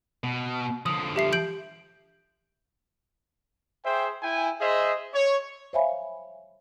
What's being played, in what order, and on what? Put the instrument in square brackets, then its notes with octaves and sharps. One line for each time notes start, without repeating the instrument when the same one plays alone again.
[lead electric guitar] B2
[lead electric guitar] D3 F3 [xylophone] D#6
[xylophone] G4 E5 C7
G6 D7 F#7
[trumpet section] G#4 C5 E5 G5
E4 G5 G#5
G#4 C5 D#5 E5
C#5
[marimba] C5 C#5 E5 F5 G#5 B5